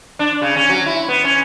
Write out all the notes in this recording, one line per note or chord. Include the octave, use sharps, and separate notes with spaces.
D4
C#3
C#4
F#3
E4
B3
C#4